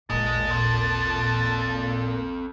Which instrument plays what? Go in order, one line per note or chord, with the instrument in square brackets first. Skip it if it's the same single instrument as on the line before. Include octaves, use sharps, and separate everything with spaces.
[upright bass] A1 D#2 [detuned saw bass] A#2 [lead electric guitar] G#4 D#5 [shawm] A5
[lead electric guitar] C4 A4